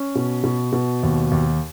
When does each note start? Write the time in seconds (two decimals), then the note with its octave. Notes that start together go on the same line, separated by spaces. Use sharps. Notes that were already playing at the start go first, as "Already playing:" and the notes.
Already playing: C#4
0.16 B2
0.44 B2
0.73 B2
1.03 D#2
1.31 D#2